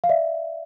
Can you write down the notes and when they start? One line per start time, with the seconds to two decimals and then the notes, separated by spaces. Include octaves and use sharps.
0.04 F5
0.09 D5 E5